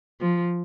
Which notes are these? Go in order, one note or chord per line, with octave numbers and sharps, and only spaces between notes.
F3